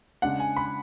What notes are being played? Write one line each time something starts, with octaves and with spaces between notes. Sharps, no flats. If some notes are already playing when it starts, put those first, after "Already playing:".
C#3 G#3 D4 F#5
G#5
B5